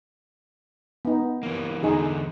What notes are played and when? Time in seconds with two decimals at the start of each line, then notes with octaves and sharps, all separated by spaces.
1.05 B3 D#4
1.43 E3 A#3
1.83 E2 D3 D#4 G#4